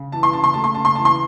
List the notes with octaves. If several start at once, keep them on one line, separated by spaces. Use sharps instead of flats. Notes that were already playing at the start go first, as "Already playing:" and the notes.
Already playing: C#3
E3 A5
C6
C#3 A5
C6
A3 A5
C6
C#3 A5
C6
E3 A5
C6